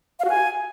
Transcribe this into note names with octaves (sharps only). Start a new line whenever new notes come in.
F5
F#4
G#5